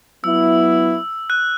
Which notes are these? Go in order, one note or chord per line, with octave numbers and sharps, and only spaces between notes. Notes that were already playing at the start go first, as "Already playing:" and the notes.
F#3 B3 E4 E6
F#6